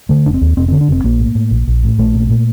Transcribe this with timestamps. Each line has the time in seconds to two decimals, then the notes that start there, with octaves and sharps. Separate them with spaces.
0.09 D3 A3
0.26 F1 D4
0.34 C4
0.41 D#2
0.57 F1 C4
0.68 D3 C4
0.81 D4
0.88 F1 C4
1.04 A#1 A#3
1.20 A2
1.35 A2
1.51 A#1
1.68 A#1
1.83 A2
1.98 A#1 A3
2.15 A#2
2.30 A#2